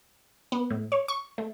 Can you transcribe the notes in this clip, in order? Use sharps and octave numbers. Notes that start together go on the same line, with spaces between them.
B3
A2
C#5
C#6
A3